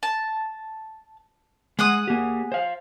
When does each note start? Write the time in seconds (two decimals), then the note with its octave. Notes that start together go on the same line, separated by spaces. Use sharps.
0.03 A5
1.79 G#3 G#4 F#5 D#6
2.08 A#3 G4
2.52 C5 F5